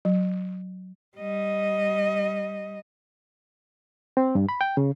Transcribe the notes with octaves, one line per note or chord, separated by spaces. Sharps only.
F#3
G3 D#5
C4
G2
B5
G5
C#3